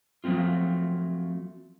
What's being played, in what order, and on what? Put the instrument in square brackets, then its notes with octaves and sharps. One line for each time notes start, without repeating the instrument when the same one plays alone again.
[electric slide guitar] F3 F#3 A3 C4 F4